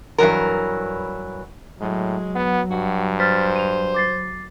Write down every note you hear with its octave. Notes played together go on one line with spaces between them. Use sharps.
G2 E3 F#3 A#4
A2 F#3 G#3
B3 F#5
G2 F#4
C5 F6 A6 B6
D#7 F7
D6 A6 C7